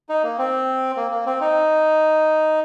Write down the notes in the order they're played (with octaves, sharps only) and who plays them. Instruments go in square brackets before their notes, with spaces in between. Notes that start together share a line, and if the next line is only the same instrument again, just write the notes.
[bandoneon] D#4
A#3
C4
A#3
A#3
C4
D#4